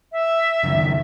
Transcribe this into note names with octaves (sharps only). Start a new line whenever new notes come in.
E5
F#1 F#2 D#3